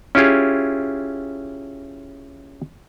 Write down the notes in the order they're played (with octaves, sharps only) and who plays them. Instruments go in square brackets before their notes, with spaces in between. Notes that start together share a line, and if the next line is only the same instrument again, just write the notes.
[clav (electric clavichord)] C#4 E4 F4 G4 G#4